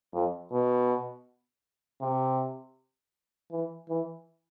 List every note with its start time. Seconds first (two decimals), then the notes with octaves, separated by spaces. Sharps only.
0.14 F2
0.52 B2
2.02 C3
3.52 E3
3.89 E3